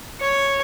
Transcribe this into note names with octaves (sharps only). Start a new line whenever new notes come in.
C#5